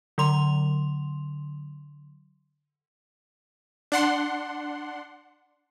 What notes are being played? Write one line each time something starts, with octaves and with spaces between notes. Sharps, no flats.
D3 F#3 C6 F7
D4 F#5 C6